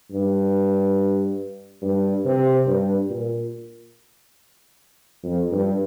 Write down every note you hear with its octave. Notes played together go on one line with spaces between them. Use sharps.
G2
G2
C3
G2
A#2
F2
G2